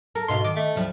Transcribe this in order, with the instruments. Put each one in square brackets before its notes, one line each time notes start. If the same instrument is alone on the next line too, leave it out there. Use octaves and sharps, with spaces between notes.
[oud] A4 [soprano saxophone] A#4
[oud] G#2 B2 F5 [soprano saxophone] C6
[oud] D#3 [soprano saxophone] D6
[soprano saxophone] A3
[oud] D2 F3 G3